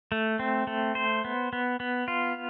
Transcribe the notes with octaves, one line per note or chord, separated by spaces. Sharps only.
A3
C4
A3
C5
B3
B3
B3
F4